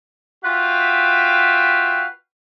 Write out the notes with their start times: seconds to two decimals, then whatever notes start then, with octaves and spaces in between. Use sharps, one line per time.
0.45 F4 F#4 B4 E5 F5 G5